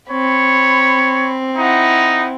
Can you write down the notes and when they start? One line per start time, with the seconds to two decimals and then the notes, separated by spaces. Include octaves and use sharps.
0.11 C4 C#5 B5
1.57 D#4 E4 F#5